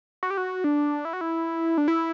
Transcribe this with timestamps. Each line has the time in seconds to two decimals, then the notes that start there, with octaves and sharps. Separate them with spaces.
0.23 F#4
0.30 G4
0.37 F#4
0.64 D4
1.05 E4
1.13 F#4
1.21 E4
1.78 D4
1.88 E4